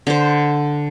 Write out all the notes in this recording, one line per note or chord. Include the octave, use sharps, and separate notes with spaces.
D3 C5